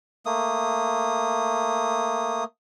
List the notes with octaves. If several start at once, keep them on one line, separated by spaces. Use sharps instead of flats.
A3 A#3 D#6